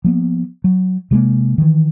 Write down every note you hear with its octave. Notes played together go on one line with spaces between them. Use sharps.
F3 A#3 B3
F#3
C3 G3 G#3 A#3
D#3 E3